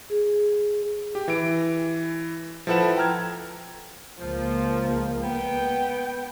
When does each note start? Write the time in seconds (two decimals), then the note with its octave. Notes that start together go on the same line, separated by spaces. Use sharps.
0.10 G#4
1.15 G4
1.28 E3 D7
2.67 F3 E4 A4 B4 F#5 E7
2.96 G5 A#5 F6 G#6
4.19 C#2 F3 A#3
5.22 B3 G5